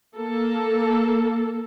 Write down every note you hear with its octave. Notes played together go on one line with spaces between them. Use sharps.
A#3 A4